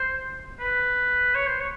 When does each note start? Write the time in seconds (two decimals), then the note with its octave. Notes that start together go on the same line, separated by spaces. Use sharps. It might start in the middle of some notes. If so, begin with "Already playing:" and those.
Already playing: C5
0.60 B4
1.35 C#5
1.47 C5
1.60 C#5